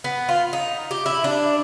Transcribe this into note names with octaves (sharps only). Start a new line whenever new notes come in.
B3
F4
D#4
G4
E4
D4